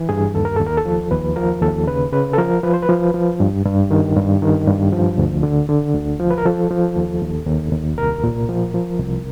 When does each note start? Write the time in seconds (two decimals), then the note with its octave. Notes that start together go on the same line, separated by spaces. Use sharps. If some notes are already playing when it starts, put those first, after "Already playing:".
Already playing: E3
0.09 G2 G#4
0.34 D#2 A4
0.45 A#4
0.56 D#2 A4
0.67 A#4
0.77 A4
0.85 F3
1.11 D#2 B4
1.36 F3 A#4
1.62 D#2 A4
1.87 C#3 B4
2.13 C#3 B4
2.33 A4
2.38 F3 A#4
2.63 F3 B4
2.74 C5
2.82 B4
2.89 F3
3.14 F3
3.40 G2
3.65 G2
3.91 D#3
4.16 G2
4.42 D#3
4.67 G2
4.92 F3
5.18 D2
5.43 D3
5.69 D3
5.94 D2
6.19 F3
6.30 B4
6.38 A#4
6.45 F3 A4
6.71 F3
6.96 D#2
7.21 D#2
7.47 D#2
7.72 D#2
7.98 C2 A#4
8.24 A#2
8.49 F3
8.74 F3
8.99 C2